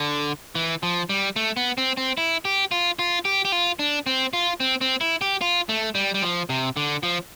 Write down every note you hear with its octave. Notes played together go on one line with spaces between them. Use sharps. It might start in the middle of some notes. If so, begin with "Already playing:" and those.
Already playing: D3
E3
F3
G3
A3
B3
C4
C4
E4
G4
F4
F4
G4
G4
F4
D4
C4
F4
C4
C4
E4
G4
F4
A3
G3
G3
F3
C3
D3
F3